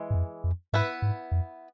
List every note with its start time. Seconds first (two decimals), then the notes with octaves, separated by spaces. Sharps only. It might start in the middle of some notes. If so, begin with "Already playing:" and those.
Already playing: E3 G#3
0.10 G#2
0.14 F2
0.44 F2
0.73 G#2 B3 E4 B4
1.02 G#2
1.32 F2